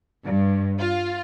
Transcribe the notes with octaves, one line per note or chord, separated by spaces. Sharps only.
G2
F4